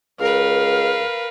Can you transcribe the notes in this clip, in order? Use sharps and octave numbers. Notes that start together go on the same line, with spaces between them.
C#2 A#4 B4 F5